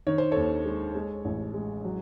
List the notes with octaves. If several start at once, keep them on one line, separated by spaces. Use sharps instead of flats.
D#3 C#5
C5
D#2 A4 C#5
G#3
G#3
A1
G#3
F#3